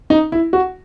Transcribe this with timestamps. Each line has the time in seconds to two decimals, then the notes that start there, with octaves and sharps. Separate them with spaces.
0.10 D#4
0.32 E4
0.53 F#4